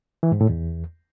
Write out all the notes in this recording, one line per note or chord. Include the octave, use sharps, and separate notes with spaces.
E3
G#2
A2
E2